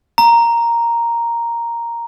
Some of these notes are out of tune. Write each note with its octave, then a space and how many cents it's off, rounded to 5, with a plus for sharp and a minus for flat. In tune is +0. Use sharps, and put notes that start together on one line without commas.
A#5 +0